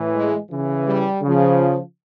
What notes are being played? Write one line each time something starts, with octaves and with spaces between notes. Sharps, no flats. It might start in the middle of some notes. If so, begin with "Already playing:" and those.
Already playing: A2 E3
G#3
C#3 E3
G3
C#3 F3